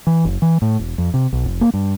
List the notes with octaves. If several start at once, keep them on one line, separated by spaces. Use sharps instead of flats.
E3
F#1
E3
A2
E1
F2
C3
B1
F1
A#3
G2